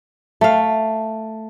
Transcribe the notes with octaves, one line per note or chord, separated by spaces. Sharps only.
A3 F5